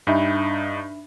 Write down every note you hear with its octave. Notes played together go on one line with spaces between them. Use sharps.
G2 D4 D#4 E5 B5